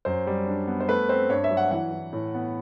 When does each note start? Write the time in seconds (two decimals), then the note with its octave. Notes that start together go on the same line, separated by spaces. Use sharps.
0.05 F#2 C5
0.27 G3
0.46 D4
0.67 B3
0.80 C5
0.88 A3 B4
1.09 C4 C5
1.29 G2 C#5
1.44 E5
1.50 F#3
1.57 F#5
1.71 E3 F#5
1.92 E3
2.13 A2
2.34 B3